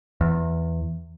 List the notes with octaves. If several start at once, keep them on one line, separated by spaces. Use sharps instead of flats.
E2